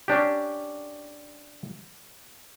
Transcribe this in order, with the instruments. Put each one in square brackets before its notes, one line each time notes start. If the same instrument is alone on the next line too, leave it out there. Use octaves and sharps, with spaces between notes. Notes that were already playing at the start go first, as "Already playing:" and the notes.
[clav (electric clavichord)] C#4 D4 G4